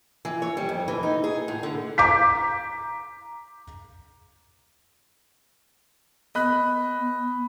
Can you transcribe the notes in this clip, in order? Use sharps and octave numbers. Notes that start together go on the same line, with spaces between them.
E3
C#5
G3
F2
E3
D#4
G#4
A2
D3
A#5 D6 G6 B6
B3 D#5 B5 F#6